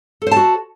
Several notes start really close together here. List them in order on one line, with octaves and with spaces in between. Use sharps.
A4 C5 A5 F#4